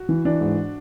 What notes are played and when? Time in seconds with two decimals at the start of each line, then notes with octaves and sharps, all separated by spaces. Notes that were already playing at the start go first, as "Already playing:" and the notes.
Already playing: F#4
0.09 E3
0.25 E3 D4
0.41 G#2